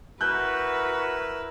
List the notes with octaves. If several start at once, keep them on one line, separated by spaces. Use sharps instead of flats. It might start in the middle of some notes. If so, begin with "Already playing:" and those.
E4 F#4 A#4 B4 E6 F#6 G6